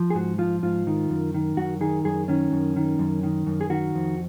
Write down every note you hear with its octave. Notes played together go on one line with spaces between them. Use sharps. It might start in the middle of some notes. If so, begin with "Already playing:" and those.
Already playing: F3
G#4
G#2 F#4
F3 F4
G#2 F4
D#3
F#2
D#3
F#2 F#4
D#3 G#4
F#2 G#4
D#3 C#4
F#2
D#3
F#2
D#3
F#2
G#4
D#3 F#4
F2